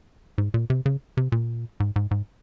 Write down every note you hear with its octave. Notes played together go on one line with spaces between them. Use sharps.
G#2
A#2
C3
C#3
C3
A#2
G#2
G#2
G#2